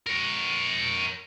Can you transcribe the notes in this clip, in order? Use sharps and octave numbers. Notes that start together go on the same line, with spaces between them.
A#4 C#5